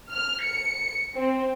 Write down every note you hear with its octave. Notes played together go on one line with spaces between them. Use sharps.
F6
C#7
C4